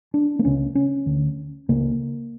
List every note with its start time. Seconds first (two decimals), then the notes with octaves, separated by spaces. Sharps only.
0.14 D4
0.39 A#3
0.45 C#2 C#3 C#4
0.75 C#4
1.06 D2 D3
1.69 C#2 C#3 A#3